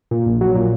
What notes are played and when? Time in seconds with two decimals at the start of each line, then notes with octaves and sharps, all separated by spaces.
0.11 A#2
0.26 A#1
0.41 F#3
0.55 A#2